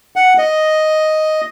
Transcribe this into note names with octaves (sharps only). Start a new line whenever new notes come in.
F#5
D#5